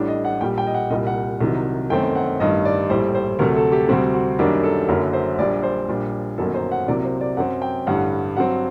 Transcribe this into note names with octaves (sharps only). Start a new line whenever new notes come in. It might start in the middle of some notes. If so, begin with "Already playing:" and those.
Already playing: A1 A2 G3 D4
D#5
F#5
A#1 A#2 G3 G5
G5
D#5
F#5
C2 A#2 G3 D#5
F#5
C2 C3 D#3 F#3
G1 F#2 D#3 A3 C4 G5
F#5
A1 G2 D#3 G3 D#5
D5
A#1 A2 G3 C5
C5
D2 C3 F#3 A3 A#4
A4
G4
D2 C3 G3 C4 F#4
F#4
F#2 D#3 G3 A#3 D4 F#4
A4
F#1 F#2 D3 F#3 A#4
C5
A#1 A#2 G3 D4 D5
C5
A#1 A#2 G3 D4
G1 F#2 D#3 F#3 A#3 A4
C5
F#5
C2 C3 F#3 A#3 D5
C5
D5
F#2 F#3 C4 F#5
G5
A1 G2 D3 G3 F#5
G2 F#3 C4 F#5